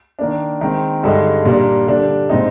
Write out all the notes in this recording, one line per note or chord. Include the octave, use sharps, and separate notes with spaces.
D#3 A#3 D4
D#3 G#3 C4
G2 D3 G#3 D#4
A#2 G3 A#3 D4
D3 G3 D4
A#2 G#3 C4 D#4